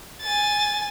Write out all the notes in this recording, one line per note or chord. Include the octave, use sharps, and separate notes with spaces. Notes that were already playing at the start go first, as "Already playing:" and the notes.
G#5 A6